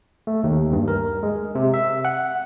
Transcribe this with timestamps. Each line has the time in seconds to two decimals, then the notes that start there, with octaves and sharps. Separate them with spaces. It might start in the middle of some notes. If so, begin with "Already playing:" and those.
0.27 A3
0.44 D#2
0.73 G2
0.88 A#4
1.23 G#3
1.55 C3
1.74 E5
2.05 F#5